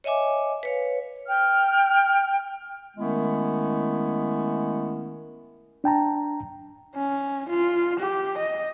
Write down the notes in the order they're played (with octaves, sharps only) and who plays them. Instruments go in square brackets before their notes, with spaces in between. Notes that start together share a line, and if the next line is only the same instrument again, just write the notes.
[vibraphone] C#5 D#5 E5 G#5 D6
B4 C#5 F5
[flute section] G5 F6
[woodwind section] D#3 G#3 A3 B3 C#4 E4
[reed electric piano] D4 G5 A5 A#5
[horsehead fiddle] C#4
F4
G4
D#5